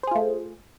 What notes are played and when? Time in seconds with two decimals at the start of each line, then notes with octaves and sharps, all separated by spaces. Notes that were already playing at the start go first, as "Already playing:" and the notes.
0.03 C5
0.07 G#4
0.11 F4
0.15 A3